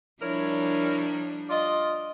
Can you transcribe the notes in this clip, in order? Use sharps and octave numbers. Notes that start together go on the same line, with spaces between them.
F3 G3 D4 E4 A#4 C#5
F4 D5 D#5